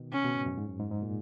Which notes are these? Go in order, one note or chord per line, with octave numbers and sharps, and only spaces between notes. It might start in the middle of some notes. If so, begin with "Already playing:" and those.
Already playing: B2 D#3
C#3 C#4
B2
G#2
F#2
G#2
F#2
G#2
G#2
A#2